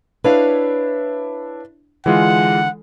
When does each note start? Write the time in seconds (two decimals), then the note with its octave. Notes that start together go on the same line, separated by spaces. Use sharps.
0.24 D4 E4 B4 C#5 F5
2.06 D3 E3 G#3 F4 F#5